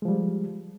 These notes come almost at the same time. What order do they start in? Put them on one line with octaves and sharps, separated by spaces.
G#3 F3 G3